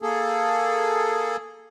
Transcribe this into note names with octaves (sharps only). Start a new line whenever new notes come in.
A#3 G#4 A4